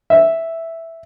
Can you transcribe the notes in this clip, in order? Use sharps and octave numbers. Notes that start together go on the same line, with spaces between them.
E5